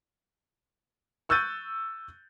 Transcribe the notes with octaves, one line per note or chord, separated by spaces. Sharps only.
C#6 E6 F#6 G6 A6 D#7